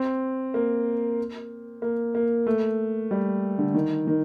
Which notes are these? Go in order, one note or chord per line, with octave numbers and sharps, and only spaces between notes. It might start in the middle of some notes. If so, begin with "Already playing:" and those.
Already playing: C4
A#3
A#3
A#3
A3
G3
D3
D#3
D#3